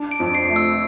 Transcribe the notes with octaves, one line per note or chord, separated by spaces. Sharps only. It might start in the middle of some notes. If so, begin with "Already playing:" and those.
Already playing: D4
D7
F2
C7
A3
E6